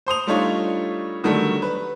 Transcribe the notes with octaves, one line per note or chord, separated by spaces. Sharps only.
C5 C6 D#6 F7
G3 A3 D4 D#4 F4 C#5
D3 D#3 F#3 G3 A3
B4